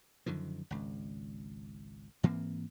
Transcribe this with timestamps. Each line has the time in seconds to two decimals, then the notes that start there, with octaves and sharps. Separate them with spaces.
0.26 F#2 D3 D#3 F3
0.71 G#1 C#2
2.23 G#2 E3 A#3 C4